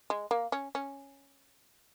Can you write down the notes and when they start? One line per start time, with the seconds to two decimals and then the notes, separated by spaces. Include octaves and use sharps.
0.10 G#3
0.31 A#3
0.52 C#4
0.75 C#4